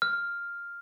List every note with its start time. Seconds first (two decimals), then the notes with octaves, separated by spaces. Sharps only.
0.02 F6